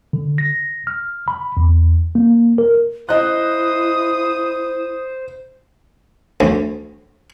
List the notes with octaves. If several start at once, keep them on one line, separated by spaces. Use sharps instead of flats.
D3
A#6
F6
B5
E2
A#3
A#4
E4 C5 D#5 D#6 F#6
D2